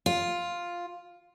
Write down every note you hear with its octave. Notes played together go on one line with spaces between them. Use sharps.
F4